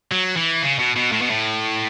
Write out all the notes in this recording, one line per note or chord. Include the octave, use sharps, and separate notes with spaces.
F#3
E3
C#3
B2
B2
A2
B2
A2